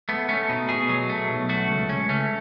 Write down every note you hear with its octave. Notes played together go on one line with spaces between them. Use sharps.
A3 B3
A3 C#4
B2 D#4
B2 G#4
F#3
A3
B1
A3 F#4
C#2
C#2 C#4
A3 C#4